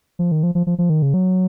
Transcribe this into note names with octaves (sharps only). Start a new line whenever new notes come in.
F3
D#3
F3
F3
F3
F3
D#3
C#3
F#3